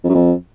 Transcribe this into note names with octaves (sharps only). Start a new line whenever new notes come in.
F2
F#2
F2